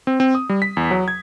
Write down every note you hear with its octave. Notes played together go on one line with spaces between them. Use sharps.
C4
C4
D#6
G3
B6
E2
F#3
G#6